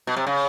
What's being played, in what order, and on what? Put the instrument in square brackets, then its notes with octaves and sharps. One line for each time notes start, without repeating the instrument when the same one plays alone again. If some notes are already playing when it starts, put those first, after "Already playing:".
[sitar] B2
C3
C#3